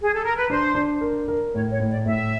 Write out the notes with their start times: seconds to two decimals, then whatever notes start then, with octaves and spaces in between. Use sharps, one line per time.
0.01 G#4
0.13 A4
0.24 A#4
0.37 B4
0.50 D4 C5
0.75 D4
1.01 A#4
1.28 A#4
1.54 A2 C#5
1.71 C#5
1.80 A2
1.89 D5
2.06 A2 E5